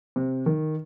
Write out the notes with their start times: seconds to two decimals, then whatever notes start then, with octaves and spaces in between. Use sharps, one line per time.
0.16 C3
0.46 D#3